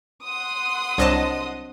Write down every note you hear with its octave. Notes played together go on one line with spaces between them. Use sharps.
F#5 C6 D#6
C2 F#3 C4 D4 D#5 A5